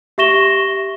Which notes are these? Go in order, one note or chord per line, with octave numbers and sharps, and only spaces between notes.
G4 E5 C#6 A#6 E7 G7